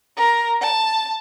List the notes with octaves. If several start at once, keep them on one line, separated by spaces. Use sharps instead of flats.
A#4
A5